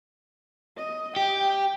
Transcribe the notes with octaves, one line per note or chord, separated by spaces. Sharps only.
D#5
G4 G5